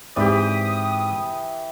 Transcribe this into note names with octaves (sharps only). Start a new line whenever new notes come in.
G#2 E3 C4 G4 D5 D#6